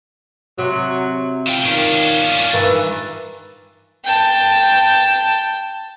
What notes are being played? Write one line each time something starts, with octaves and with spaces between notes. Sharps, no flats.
C3 F#3
B2 F4 G5
D#3 C#4 D4
G2 D#3 E3
G5 A5